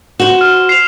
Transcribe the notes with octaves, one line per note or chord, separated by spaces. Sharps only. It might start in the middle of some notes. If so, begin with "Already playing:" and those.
F#4 C5 E7
F6
C7 F7